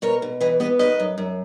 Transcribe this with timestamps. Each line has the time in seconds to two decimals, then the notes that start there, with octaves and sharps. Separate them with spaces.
0.02 B2 A#4 C#5
0.22 B2
0.40 E3 B4 D#5
0.60 B3 B4 D#5
0.79 D#3 B4 D#5
1.00 F#2
1.18 F#2